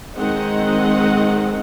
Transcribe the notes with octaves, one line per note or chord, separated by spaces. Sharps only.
D#3 G#3 C4 D#5 F#5